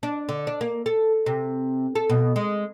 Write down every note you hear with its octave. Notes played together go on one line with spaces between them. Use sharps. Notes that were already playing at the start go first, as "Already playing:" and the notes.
D4
D3
D4
A#3
A4
C3
A4
B2
G#3